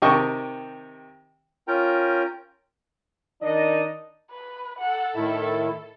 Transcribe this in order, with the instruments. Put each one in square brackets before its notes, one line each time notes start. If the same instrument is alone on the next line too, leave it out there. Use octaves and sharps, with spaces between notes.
[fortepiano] C3 D#3 D#5 G5 A5 C#6
[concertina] C#4 F4 A#4 G5 A#5
[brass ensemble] D#3 D4 D#4 D#5
[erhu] B4
[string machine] A4 [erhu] F#5
[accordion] A2 D#3 E4 [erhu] E5